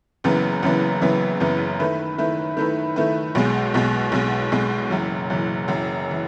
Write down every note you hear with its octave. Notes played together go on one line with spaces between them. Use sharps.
F#1 F#2 C#3 E3 B3
F#1 F#2 C#3 E3 B3
F#1 F#2 C#3 E3 B3
F#1 F#2 C#3 E3 B3
D#3 A3 E4 B4
D#3 A3 E4 B4
D#3 A3 E4 B4
D#3 A3 E4 B4
B1 B2 G#3
B1 B2 G#3
B1 B2 G#3
B1 B2 G#3
F#1 F#2 E3
F#1 F#2 E3
F#1 F#2 E3
E3